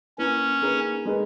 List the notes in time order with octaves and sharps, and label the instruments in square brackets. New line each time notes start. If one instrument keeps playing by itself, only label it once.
[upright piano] A#3 E4 B4 [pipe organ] C#4
[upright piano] A#3 D#4 G#4 B4
G#3 D#4 G#4 B4